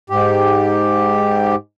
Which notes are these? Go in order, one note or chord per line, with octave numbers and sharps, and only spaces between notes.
G#2 G4